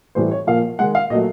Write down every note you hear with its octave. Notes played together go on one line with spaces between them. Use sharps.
A2 E3 G3 C5
C#5
A#2 F3 A#3 F5
D#3 G#3 F#5
F5
A#2 F#3 A3 D#5